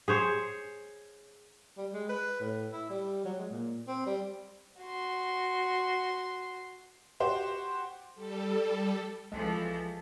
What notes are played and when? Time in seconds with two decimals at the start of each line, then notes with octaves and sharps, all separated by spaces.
0.08 G#4 C5 C#5
1.78 G3
1.93 G#3
2.09 B4
2.40 A2
2.72 E4
2.90 G3
3.24 F#3
3.37 G#3
3.51 A#2
3.87 C4
4.06 G3
4.80 F#4 C6
7.20 F#4 G4 C5
8.15 G3 A4
9.32 C2 E3 F3 G#3 A4